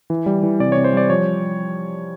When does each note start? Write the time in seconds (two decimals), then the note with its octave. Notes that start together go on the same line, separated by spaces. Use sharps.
0.10 E3
0.26 G3
0.43 E3
0.60 C3 D5
0.72 C3 C#5
0.84 C5
0.93 G3 D5
1.10 F3 C#5